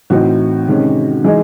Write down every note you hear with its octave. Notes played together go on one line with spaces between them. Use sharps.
A2 E3 C4 D#4 F#4
C3 D#3 G#3 C#4
E3 G#3 D#4 G#4